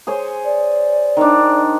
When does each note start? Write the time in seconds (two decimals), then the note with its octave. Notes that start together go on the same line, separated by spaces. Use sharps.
0.07 G#4 C5 C#5
0.45 D5
1.17 D#3 D4